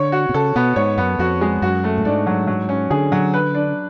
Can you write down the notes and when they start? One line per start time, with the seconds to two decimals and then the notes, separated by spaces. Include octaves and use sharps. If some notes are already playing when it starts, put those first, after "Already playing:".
Already playing: D3 C#5
0.12 F#4
0.29 B2
0.34 C#3 A4
0.56 B2 B3
0.76 G#2 C#5
0.97 F#2 B3
1.19 F2 F#4
1.41 G#3
1.62 F#2 F#4
1.84 A3
1.98 A2
2.05 G#2 D4
2.27 F#3
2.47 F#3
2.69 C#4
2.90 D3 G#4
3.12 F#3
3.34 B4
3.54 D4